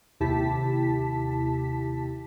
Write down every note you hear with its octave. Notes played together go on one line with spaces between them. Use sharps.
D#2 C3 E4 G4 A5 B6